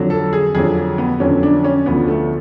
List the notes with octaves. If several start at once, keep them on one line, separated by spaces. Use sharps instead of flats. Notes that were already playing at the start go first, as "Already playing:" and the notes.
Already playing: F2 D3 F#3
A4
G#4
F2 D3 F#3 G#4
B3
F2 D3 F#3 C#4
D4
C#4
D2 D3 F3 B3
A3